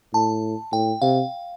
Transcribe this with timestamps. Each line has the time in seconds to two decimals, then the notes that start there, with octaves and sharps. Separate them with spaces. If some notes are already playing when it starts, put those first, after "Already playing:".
0.14 A2 A5
0.72 A2 G5
1.02 C3 F5